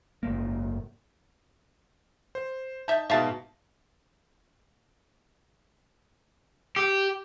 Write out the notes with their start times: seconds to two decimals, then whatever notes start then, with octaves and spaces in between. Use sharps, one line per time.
0.23 F#1 G#2 A#3
2.35 C5
2.88 D#4 E5 A5 G6
3.10 G#2 B2 E5 F5 A5
6.76 G4